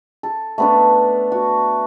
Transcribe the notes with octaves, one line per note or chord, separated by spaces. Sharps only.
A4
A3 B3 D4
F#4